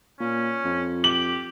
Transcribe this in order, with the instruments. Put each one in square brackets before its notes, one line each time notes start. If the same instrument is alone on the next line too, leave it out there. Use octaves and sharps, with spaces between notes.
[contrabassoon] A#2 [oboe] C#4
[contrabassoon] F2
[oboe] G4 [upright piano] F#7